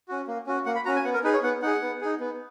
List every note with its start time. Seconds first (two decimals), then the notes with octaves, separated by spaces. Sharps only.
0.08 C#4 F#4
0.28 A#3
0.47 C#4 F#4
0.66 A#3 F#5
0.75 B5
0.85 C#4 F#4 A#5
0.96 G#5
1.05 B3 F#5
1.14 A#4
1.24 D#4 G#4 B4
1.34 C#5
1.43 B3 F#5
1.62 D#4 G#4 F#5
1.81 B3
2.01 D#4 G#4
2.20 B3